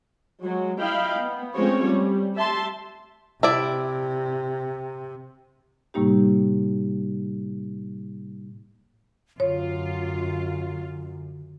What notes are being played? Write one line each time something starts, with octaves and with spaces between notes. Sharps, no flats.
F#3 G#3
E4 D#5 F5 G5 B5
B3
F3 G#3 A3 C4 C#4 C#5
G3
G4 E5 A5 C6
C3 E4 D5
A2 C3 G3 A#3 D#4 G4
F#2 D3 F4 C#5